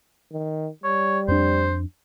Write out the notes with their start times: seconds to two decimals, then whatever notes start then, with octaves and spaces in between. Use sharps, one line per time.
0.33 D#3
0.84 G3 C#5
1.28 F2 D4 C5